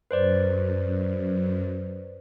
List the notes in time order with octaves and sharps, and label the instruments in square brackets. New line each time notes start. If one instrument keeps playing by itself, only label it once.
[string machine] F#2 [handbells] B4 C5 D5